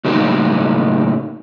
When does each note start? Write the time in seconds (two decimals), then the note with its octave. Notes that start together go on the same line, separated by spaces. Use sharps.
0.05 A2 C#3 F#3 A#3 D#4 F#4